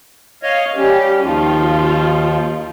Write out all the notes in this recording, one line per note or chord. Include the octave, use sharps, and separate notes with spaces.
C#5 D#5 F5
G3 C#4 G4
D#2 D#3 F3 F4